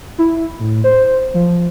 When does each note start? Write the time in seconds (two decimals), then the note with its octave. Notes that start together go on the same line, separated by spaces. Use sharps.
0.18 E4
0.59 A2
0.84 C5
1.34 F3